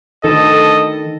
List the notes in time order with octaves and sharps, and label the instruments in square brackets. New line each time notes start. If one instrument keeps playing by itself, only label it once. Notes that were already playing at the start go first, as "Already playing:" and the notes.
[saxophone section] D2 A4 [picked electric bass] D#3 [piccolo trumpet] D#5